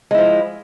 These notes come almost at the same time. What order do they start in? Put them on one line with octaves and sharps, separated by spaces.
G#3 E4 F3